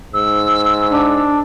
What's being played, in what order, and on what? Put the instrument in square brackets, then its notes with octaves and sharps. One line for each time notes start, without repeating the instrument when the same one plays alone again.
[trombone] G#2 [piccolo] E6
[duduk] D4